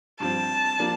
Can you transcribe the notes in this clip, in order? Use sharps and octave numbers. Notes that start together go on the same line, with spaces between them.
G2 F3 C4 A5
F3 A#3 D4